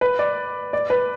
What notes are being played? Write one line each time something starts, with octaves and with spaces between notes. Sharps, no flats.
B4
D5
D5
B4